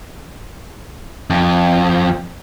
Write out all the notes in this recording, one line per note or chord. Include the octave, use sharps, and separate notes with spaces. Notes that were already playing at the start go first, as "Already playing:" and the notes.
F2